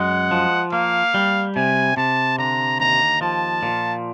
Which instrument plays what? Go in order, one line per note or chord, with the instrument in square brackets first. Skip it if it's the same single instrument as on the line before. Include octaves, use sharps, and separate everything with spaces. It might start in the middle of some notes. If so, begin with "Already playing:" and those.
Already playing: [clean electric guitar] F#2 G#3 [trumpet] F#5
[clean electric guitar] F3
[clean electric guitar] A#3 [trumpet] F5
[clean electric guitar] G3
[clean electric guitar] C3 [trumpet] G#5
[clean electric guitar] C3 [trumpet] A5
[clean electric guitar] D3 [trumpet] A#5
[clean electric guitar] D#2 [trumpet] A#5
[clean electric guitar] F3 [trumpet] A5
[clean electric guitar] A#2